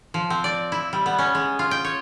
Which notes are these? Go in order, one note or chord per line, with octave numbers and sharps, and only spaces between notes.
F3
C4
D5
E4
G3
B3
C#4
G#3
F4
G5
C#5